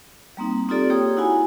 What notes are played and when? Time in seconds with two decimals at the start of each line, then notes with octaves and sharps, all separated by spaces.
0.37 G3 A#3 C4 D#4
0.69 C4 D#4 F4 G4 A4 D5
0.90 A#3 G4 G#4 C#5 G5 D#6
1.17 D#4 E4 F#4 F#5 G#5 B5